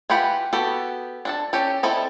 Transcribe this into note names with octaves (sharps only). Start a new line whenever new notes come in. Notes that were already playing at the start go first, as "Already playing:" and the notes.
E3 F4 G4 F#5 B5
B3 F#4 G4 A4
D4 A4 A5
C#4 G4 A4
G3 C4 E4 A4 D#5